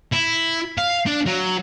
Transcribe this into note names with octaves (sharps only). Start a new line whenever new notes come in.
E4
F5
D4
F#3